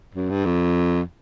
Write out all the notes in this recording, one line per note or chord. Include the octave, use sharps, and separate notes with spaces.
F#2
G2
F2